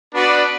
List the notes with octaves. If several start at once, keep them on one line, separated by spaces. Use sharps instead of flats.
B3 D4 F#4 B4 D5